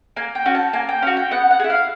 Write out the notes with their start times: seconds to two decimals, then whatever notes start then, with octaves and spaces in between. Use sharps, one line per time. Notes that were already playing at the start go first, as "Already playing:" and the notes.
0.16 A#3 G#5
0.35 G5
0.46 C#4 F#4
0.55 A5
0.73 A#3 G#5
0.89 G5
1.02 C#4 F#4 F5
1.17 G5
1.31 B3 F#5
1.51 F#5
1.60 G#4
1.64 E4
1.70 F5